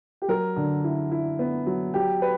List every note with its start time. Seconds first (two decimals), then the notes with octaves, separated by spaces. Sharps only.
0.22 G4
0.28 F#3 A#4
0.56 D3
0.84 E4
1.11 E4
1.39 B3
1.67 F#3
1.94 F#3 G4
2.22 B4